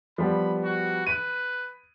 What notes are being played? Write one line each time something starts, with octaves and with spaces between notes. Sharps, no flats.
F3 G3 B3 B5
F#4
B4 D#7